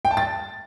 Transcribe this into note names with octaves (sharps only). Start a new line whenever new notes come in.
G5
A5
A6